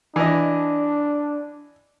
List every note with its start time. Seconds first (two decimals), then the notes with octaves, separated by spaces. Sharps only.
0.16 E3 D4 D#5